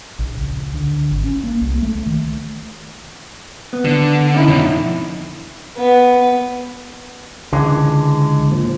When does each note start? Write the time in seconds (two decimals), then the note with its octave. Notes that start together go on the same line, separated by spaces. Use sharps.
0.19 A#1
0.36 C#2
0.74 D3
1.11 G#1
1.24 C#4
1.44 A#3
1.61 C2
1.82 A3
2.06 D#3
3.73 B3
3.85 D3
4.34 C#4 D#4 E4
4.48 F2 B2
5.78 B3
7.53 C#2 D3 E3 G#3
8.51 A#2 F3